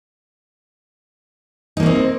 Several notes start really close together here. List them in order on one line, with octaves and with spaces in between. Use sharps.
D#4 A#3 C#4 C4